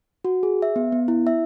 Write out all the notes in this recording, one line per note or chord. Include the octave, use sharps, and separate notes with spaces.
F#4
G#4
E5
B3
B3
E4
E5